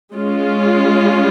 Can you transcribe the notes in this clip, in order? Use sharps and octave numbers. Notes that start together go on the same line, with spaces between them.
G#3 C#4 F4